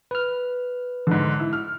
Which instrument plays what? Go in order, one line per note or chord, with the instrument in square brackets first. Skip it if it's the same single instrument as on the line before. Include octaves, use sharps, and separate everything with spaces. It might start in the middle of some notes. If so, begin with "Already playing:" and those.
[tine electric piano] B4 F6
[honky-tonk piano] G#2 D3
E4
F6